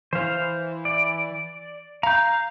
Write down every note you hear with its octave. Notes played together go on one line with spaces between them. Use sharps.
E3 C5 F5
D5
F5 A#5 G6